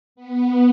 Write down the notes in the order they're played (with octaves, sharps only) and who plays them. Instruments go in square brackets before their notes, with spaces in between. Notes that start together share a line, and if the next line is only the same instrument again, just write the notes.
[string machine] B3